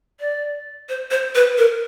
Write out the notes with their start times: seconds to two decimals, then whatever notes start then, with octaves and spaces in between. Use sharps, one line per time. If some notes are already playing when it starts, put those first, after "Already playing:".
0.20 D5
0.89 C5
1.11 C5
1.35 B4
1.58 A#4